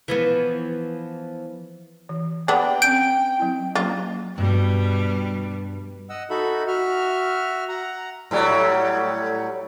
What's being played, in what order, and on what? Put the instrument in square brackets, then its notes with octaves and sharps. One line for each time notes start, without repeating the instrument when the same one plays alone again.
[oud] E3 F3 B3
[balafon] E3
[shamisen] B3 D4 [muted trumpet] G5
[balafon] C4 C#4 G#5 [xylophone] G6 D7
[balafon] F#3 C4 E4
[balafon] F#3 A#3 C#4 [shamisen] F4
[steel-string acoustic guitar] G2 [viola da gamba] B2 G3
[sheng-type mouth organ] D#5 F#5 E6
D#4 F#4 A4 E5 B5
F#4 E5 F6
F#5 A#5
[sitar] A2 F#3 G3